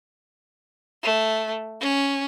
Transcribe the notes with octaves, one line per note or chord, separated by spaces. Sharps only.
A3
C#4